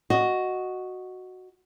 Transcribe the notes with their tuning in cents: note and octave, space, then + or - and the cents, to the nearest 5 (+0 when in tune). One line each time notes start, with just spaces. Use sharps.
F#4 +0 D#5 -5